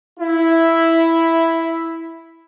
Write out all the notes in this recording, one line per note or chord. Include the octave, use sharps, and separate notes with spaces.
E4